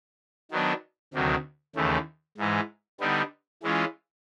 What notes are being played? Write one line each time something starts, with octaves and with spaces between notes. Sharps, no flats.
D#3 F#3 B3 D4
D2 C3 D#3 F#3
D#2 C#3 E3 A3
G#2 E3 G#3
D3 G3 B3 D#4
E3 G#3 C#4 F4